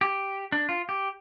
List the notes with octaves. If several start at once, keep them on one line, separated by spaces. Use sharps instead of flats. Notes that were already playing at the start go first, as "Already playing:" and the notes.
G4
D4
F4
G4